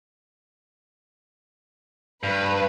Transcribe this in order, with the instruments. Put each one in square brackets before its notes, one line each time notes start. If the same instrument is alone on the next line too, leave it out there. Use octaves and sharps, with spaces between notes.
[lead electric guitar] G2 [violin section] B4